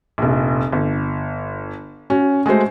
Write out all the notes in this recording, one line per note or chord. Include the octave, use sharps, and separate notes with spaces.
F1 A#1
G1
C#4 F#4
G#3 A3 F#4 C5